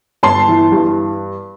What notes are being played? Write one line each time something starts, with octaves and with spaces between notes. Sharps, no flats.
G1 A5 C6
E3
G2